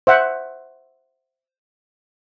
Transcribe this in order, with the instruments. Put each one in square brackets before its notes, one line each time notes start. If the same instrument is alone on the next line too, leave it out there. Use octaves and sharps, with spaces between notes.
[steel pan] C5 E5 F#5